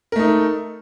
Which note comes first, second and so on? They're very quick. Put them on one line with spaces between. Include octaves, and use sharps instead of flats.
A#4 A3 D#4